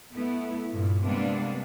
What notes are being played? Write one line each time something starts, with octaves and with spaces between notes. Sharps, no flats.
A3 B3 E4
G2 A#2
C3 G3 G#3 A#3 B3 D4